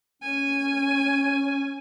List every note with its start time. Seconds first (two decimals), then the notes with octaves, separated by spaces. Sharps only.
0.22 C#4 G#5